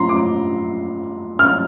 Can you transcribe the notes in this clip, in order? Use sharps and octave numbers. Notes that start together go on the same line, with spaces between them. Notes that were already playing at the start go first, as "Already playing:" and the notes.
Already playing: A2 F3 A#5 C6
D6
F6